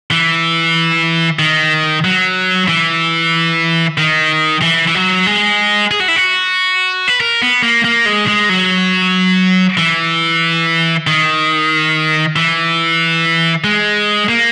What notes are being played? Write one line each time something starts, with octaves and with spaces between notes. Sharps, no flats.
E3
D#3
F#3
E3
D#3
E3
E3
F#3
G#3
G#4
F#4
E4
F#4
B4
A#4
B3
A#3
A#3
G#3
G#3
F#3
E3
D#3
E3
G#3
A#3